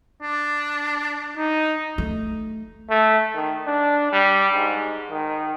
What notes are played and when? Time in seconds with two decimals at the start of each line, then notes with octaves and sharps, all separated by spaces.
0.22 D4
1.37 D#4
1.98 A3
2.89 A3
3.34 D#3
3.66 D4
4.12 G3
4.54 G#2
5.10 D#3